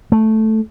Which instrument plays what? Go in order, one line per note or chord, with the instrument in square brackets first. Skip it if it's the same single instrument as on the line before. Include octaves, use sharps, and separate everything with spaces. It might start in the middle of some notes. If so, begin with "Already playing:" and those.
[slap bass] A3